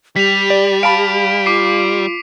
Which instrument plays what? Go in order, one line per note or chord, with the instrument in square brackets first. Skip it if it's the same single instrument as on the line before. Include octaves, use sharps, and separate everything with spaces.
[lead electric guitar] G3 [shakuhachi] G4 [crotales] B6 F7
[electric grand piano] D5
[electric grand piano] F5 A5 B5 [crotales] D7
[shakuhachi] F4 [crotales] D6 C7